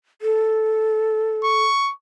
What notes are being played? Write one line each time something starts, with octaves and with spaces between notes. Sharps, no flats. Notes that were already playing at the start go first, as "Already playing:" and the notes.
A4
C#6